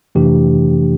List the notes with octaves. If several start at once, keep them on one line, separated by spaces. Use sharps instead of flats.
F2 C3 E3 A3 D4 G4